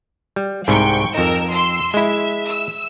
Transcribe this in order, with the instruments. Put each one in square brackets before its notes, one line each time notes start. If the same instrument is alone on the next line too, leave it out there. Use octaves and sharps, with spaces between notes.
[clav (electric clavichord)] G3
[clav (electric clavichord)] C2 G#2 C3 [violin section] G5 C#6
[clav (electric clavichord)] F2 D#4 [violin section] A#4 E6
[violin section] C6 E6
[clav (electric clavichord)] G#3 E4 [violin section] E5
[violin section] E6